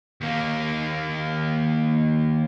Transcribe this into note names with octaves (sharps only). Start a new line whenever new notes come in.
D#2 A#3